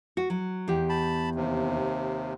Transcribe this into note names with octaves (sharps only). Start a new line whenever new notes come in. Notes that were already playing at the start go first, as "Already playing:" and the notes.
F#4
F#3
E2 G4
A5 B5
D#2 C3